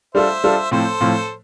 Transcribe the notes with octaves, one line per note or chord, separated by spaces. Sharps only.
G3 D4 F4 A4 C5 E5
G3 D4 F4 A4
A2 F3 C4 A4 C5
A2 F3 C4